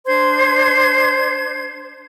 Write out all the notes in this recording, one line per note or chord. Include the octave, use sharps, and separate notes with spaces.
D4 C5 C6 G#6